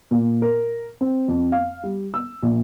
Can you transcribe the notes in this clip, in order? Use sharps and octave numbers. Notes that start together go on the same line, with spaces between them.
A#2
A#4
C4
F2
F5
G3
E6
A#1